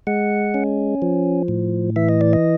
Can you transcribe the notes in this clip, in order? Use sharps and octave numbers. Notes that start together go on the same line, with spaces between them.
G#3 F#5
C#4
F3
A2
E3 E5
D#5
D5
D#5